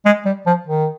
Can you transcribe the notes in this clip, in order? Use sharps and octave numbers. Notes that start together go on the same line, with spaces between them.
G#3
G3
F3
D#3